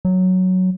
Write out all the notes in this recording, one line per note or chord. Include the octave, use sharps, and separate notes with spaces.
F#3